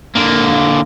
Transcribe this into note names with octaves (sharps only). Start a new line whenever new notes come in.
D3 A#3